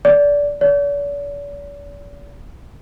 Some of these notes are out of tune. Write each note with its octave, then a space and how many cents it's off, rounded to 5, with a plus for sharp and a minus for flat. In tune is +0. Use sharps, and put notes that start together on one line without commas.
D5 -20
D5 -45